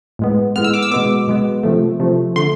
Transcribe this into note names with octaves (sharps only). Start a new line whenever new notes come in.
A2 G#3 B3
A2 G#3 B3 F6
E6
D6
E6
B2 G#3 B3 D6
B2 G#3 B3
C3 F3 A3
C3 F3 A3
D3 A3 C6